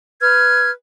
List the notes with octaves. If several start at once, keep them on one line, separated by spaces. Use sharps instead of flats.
B4 F6 G#6